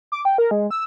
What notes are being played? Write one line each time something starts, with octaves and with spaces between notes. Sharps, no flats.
D6
G5
A#4
G#3
E6